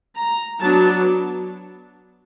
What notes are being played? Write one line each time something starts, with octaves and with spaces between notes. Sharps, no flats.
A#5
F#3 B3 D4 A5